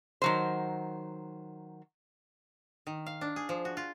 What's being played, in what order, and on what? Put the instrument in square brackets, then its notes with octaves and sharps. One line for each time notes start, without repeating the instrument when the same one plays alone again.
[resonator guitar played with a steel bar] D#3 F#3 C5
[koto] D#3
F5
D4
G#4
F3
F#4
F4